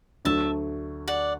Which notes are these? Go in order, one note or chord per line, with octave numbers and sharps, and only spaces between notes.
D2 D3 F#3 A3 E5 A5
D5 F#5